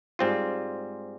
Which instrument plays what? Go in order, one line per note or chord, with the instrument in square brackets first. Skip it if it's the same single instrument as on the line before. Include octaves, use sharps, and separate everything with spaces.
[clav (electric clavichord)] G#2 G3 C4 F4